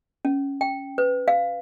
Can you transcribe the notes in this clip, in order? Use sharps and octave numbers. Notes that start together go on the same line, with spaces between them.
C#4
G5
B4
F5